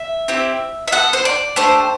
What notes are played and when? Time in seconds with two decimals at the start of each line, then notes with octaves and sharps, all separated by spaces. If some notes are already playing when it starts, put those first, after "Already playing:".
Already playing: E5
0.28 C4 E4 G4
0.88 E5
0.92 B3 F#4 A4 F#5
1.13 C5
1.25 D5
1.56 A3 D4 G4 C5